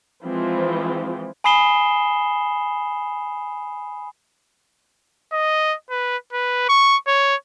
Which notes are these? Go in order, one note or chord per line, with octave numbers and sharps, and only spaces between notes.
E3 F3 G#3 C4 F4
G#5 B5 D#6 C7 E7 G7
D#5
B4
B4
C#6
C#5